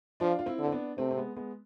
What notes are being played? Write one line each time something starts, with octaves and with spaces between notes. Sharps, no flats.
F3 D4 F4
F4
C4 E4
D3
C4
B3 D4
C3 A3 C4
C4
G#3 B3
G#3 B3